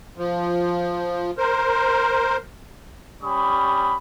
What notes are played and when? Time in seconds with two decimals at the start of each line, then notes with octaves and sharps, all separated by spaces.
0.18 F3
1.38 A#4 C5
3.22 G3 C#4 B5 C#6 D#6